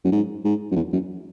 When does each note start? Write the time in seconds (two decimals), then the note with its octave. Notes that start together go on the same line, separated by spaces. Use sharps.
0.05 F#2
0.12 G#2
0.45 G#2
0.72 F#2
0.76 E2
0.93 F#2